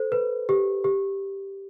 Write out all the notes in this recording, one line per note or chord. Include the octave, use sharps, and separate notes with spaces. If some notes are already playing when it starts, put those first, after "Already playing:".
Already playing: A4 C5
B4
G4
G4